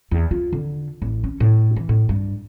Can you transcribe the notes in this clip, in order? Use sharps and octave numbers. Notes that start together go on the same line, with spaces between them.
E2
F4
D3
A1
C#4
A2
E3
A2
G2